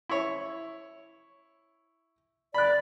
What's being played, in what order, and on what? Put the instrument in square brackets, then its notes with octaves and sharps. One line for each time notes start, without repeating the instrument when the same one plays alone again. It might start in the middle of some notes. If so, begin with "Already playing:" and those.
[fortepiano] E4 C#5
[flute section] D5 [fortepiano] B5 F#6